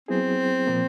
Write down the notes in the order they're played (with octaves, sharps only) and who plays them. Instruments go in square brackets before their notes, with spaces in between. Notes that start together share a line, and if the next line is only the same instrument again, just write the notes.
[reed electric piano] F#3 B3 E4 G#4 [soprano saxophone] C4
[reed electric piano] A#2 F3 A#3